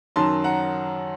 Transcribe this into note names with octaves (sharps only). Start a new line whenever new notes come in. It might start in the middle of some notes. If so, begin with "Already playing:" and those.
F#2 D#3 F#3 A5 C6
F#5 A#5